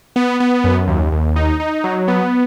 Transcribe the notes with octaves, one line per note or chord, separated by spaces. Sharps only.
B3
B3
F#2
D#2
D#2
D#4
D#4
F#3
B3